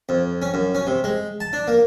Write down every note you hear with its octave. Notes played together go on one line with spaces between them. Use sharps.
F2
C#4
F#2
C#4
C3
G#3
A5
D4
A#3